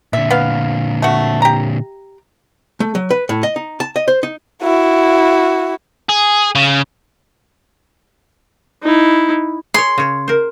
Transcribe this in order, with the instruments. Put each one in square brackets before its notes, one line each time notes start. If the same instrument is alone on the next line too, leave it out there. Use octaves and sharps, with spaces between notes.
[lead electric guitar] A#2 D3 [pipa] E5
[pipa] B3 F5
A3 F#4
G4 A#5
[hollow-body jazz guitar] A3
F#3
B4
A2
D#5
D#4
A5
D#5
C5
D#4
[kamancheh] E4 F#4
[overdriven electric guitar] G#4
C#3
[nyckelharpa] D#4 E4
[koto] G#4 C#5 [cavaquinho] C6
[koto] C#3 C#5
A#4 C5